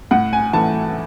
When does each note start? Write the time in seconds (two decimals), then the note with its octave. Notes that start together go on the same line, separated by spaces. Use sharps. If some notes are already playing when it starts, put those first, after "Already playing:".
0.11 A2 F#5
0.33 G#5
0.53 E3 A3 A5